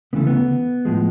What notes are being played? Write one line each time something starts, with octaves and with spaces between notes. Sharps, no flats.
D2 C#3 E3 A3 B3
B3
A2 F3 G#3